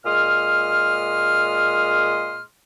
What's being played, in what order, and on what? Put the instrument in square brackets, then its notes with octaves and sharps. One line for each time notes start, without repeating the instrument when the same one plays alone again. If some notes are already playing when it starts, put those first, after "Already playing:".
[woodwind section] A#2 G#3 C6 D#6 F6